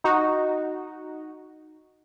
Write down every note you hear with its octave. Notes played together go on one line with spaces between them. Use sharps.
D#4 F#4